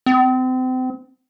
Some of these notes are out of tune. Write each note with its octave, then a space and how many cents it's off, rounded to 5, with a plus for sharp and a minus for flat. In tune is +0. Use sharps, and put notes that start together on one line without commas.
C4 -35